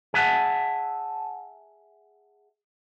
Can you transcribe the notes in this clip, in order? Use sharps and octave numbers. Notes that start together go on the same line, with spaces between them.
G#4 E5 F#5 A5